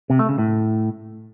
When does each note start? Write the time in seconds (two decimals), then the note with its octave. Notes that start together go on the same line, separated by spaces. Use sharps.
0.10 C3
0.19 A3
0.29 C#3
0.39 A2